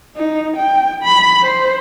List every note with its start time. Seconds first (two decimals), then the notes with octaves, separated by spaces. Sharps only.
0.16 D#4
0.57 G5
1.04 B5
1.42 C5